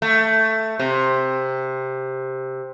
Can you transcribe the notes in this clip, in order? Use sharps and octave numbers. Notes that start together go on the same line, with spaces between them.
A3
C3